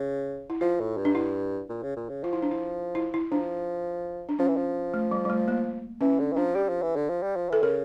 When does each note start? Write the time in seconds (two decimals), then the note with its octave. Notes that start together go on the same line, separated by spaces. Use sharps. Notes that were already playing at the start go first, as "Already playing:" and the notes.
Already playing: C#3
0.50 E4
0.61 F3 F4
0.80 A2
0.98 G2
1.05 D4
1.15 E4
1.69 A#2
1.83 C#3
1.96 A#2
2.09 C#3
2.24 F3 F4
2.33 E4
2.42 D4
2.51 E4
2.95 E4
3.14 E4
3.31 F3 D4
4.29 D4
4.39 F3 C#4
4.48 E3
4.57 F3
4.94 A3
5.11 G3
5.25 G3
5.30 A3
5.48 A#3
6.01 E3 C#4
6.20 D3
6.32 E3
6.37 F3 D4
6.55 G3 G4
6.69 F3
6.82 E3
6.96 D3
7.09 F3
7.22 G3
7.36 F3
7.49 E3 A4
7.63 C#3 A#4